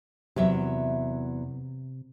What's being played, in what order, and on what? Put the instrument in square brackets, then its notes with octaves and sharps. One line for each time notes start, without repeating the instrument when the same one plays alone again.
[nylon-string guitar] E2 F#3 E5 [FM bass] C3